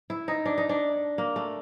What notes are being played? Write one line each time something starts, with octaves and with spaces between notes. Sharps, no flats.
E4
D#4
D4
D#4
D4
A#3
A3